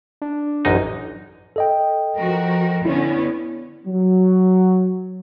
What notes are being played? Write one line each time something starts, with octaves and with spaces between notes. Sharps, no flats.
D4
A1 F#2 D#4
A4 D#5 G5
F3 F#4 A#4
D3 B3 C#4 E4
F#3